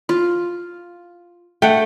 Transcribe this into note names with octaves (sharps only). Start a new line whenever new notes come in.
F4
A3 F#5 G5